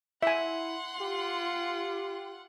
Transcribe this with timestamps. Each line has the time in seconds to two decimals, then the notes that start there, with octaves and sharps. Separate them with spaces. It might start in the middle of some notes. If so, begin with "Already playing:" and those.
0.23 E4 E5 F#5 G#5 C6
1.00 F4 G4